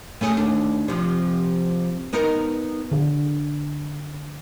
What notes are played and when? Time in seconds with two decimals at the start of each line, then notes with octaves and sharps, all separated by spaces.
0.21 A3 C#4 G#4
0.37 D#2 D4
0.88 C3 F3
2.13 B3 D#4 A#4
2.92 D3